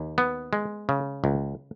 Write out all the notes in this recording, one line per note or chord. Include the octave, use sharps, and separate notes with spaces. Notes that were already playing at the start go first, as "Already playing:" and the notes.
Already playing: D#2
B3
G#3
C#3
C#2